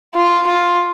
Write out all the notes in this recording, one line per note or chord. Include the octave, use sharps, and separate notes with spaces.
F4
F4